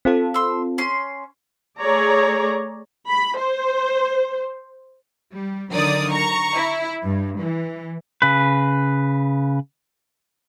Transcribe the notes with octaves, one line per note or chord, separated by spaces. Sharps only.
C4 F4 A4
C6 E6
C#4 C6
A3 G#4 C#5 D5 A#5
B5
C5
G3
D3 D#3 F#3 A#4 D5 D#6
A#5 C#6
E4
G2
E3
C#3 B4